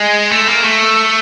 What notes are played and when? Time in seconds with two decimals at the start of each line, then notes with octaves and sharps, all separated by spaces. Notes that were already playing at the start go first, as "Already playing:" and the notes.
Already playing: G#3
0.32 A3
0.49 A#3
0.65 A3